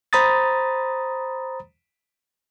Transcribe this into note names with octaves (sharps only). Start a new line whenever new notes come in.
C5 A#5 B5 D#6 A6